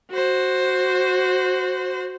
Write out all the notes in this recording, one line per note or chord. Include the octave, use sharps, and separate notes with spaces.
F#4 C5